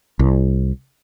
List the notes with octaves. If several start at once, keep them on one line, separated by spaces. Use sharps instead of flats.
C2